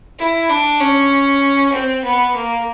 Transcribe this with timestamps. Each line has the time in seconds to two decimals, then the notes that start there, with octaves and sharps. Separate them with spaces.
0.19 E4
0.50 D4
0.80 C#4
1.72 C4
2.04 B3
2.35 A#3